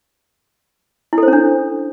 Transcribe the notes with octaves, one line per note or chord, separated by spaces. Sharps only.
E4
A4
C5
C#4
D4